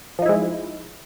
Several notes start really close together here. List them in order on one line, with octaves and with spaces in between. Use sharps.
F3 D#4 E4 G#3